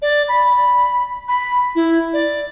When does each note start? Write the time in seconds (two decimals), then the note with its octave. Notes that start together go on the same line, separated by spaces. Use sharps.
0.02 D5
0.29 B5
1.29 B5
1.75 E4
2.13 D5